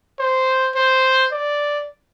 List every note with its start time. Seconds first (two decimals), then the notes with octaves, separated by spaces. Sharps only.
0.20 C5
0.76 C5
1.32 D5